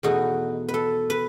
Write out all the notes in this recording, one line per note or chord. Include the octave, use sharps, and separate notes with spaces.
E2 B2 A3 D#4 F#4
B4
A4
B4